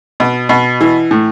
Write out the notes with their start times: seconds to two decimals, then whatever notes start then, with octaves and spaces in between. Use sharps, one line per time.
0.20 B2
0.49 B2
0.81 E3
1.11 A2